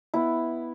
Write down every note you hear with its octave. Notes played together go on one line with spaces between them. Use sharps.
B3 E4